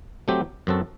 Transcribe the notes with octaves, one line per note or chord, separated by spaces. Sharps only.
F#3 A3 C4 G4
F#2 F#3 C4 F#4 A4